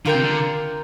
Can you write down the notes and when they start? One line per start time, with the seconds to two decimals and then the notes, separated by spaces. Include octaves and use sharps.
0.05 D3 F4 A#4 G5
0.14 C3
0.24 D3